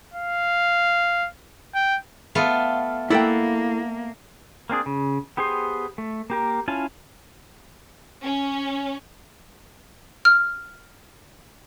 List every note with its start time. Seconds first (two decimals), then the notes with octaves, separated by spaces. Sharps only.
0.14 F5
1.75 G5
2.35 A3 B3 F4
3.10 A#3 E4 A4 D5 F#5 G5 B5
4.70 A#3 C4 D4 G#4
4.86 C#3
5.37 B3 G4 G#4 C5 C6
5.98 A3
6.30 A#3 G4 A#4
6.68 C#4 E4 F4 G#5 A5
8.23 C#4
10.25 F6